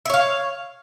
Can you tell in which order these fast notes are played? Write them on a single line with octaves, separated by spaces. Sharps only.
E5 C#5 F5